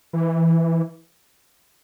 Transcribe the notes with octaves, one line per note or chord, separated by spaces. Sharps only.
E3